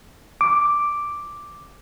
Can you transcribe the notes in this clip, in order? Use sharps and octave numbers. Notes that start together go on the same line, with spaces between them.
D6